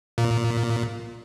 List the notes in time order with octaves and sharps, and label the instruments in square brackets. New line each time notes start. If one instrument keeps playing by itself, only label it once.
[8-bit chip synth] A#2